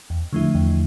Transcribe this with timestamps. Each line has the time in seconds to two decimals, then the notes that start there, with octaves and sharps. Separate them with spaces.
0.10 E2
0.33 D3 F3 A3 E4
0.55 E2